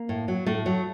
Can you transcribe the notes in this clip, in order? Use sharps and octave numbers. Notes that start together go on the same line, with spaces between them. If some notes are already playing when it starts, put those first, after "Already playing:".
Already playing: A#3
A2
F#3
A2 A3
F#3